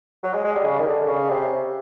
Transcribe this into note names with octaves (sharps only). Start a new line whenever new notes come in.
F#3
G#3
G#3
G3
C#3
D#3
D3
C#3
C3